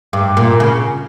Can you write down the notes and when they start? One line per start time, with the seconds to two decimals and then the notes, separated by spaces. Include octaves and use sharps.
0.13 G2
0.37 A#2
0.60 C#3